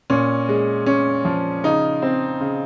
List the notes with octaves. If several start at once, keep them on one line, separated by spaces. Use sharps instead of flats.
A#2 C#4
G#3
C#4
F3
C#3 D#4
C4
C#3